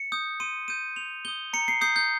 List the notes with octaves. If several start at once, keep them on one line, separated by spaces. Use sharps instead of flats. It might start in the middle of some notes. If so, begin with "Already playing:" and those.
Already playing: C#7
D#6 G6
C6 D#7
D#6 G6 D#7
C6 F7
D#6 G6 G7
A#5 C#7
C7
D#6 G6 C7
G6